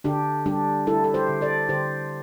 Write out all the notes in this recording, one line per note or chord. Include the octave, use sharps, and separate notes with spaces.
D3 D4 G4
G3 D4 G4
G3 E4 A4
A4
G4 C5
D3
A4 D5
D3 G4 C5